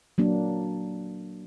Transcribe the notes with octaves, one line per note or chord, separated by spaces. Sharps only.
F#3 A#3 D4